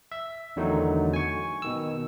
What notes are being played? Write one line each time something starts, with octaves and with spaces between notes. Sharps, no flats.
E5
E2 D3 D#3 F#3 A3 D#4
G#5 C#6
B2 D#3 E6